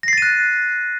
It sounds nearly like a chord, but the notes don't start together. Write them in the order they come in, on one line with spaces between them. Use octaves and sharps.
A#6 C7 A6 D#7 F#6